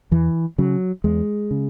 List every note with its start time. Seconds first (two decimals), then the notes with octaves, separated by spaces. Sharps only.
0.11 E2 E3
0.58 C#3 F#3
1.04 E2 G#3
1.51 C#3